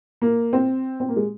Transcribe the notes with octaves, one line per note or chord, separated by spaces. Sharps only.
A#3
C4
C4
A#3
G#3